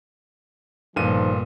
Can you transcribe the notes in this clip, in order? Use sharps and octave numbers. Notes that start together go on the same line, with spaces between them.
G1 A#2 D#3 F3 D#7